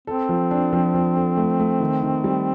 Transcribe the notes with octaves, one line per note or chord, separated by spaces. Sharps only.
C4 A4
F3
D4
F3
F3
A4
A3
A3
D#3
D#3
G3